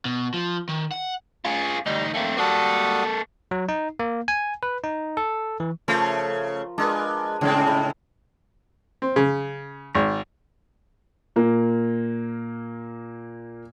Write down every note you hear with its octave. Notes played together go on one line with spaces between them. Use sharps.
B2
F3
D#3
F#5
F4 G#4
D2 G3 D#4
A3 A#3 C4
G3 A#3 F#4 A4 D#6
F#3
D#4
A#3
G#5
B4
D#4
A4
E3
C#3 F3 A3 A#4
G#3 D4 A#4 B4
A2 C#3 G#3 C4 A5
E4 B5
C4
C#3
G#1
A#2 A#3